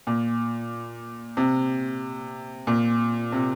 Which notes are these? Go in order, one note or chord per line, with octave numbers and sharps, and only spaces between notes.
A#2
C3
A#2
C3